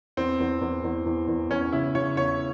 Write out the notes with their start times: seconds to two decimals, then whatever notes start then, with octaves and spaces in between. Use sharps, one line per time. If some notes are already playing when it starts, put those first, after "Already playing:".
0.17 E2 C4
0.40 E2
0.61 E2
0.84 E2
1.06 E2
1.28 E2
1.50 E2 C#4
1.72 C#3 E4
1.95 C#3 C#5
2.17 E2 C#5